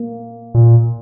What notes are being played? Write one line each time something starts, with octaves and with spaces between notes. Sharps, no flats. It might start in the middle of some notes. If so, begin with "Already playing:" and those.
Already playing: A#3
A#2